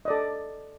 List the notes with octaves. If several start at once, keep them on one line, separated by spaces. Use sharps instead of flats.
A4 D5 D#5